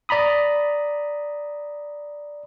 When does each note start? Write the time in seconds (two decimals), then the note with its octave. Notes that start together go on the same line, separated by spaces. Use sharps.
0.09 D5 A#5 B5 D#6